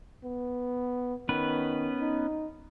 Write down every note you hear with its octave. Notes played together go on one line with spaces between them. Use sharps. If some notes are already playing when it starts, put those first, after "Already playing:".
B3
D#3 B3 C#4 B4
D#4